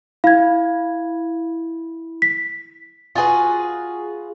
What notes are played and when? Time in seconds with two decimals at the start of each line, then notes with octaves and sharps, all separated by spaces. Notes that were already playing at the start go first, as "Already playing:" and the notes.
0.24 E4 F5 G#6
2.22 B6
3.15 F4 F#4 G#4 B4